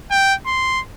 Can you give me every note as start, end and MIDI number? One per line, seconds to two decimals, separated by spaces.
0.11 0.34 79
0.46 0.80 84